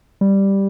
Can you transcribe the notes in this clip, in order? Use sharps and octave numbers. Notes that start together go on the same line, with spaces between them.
G3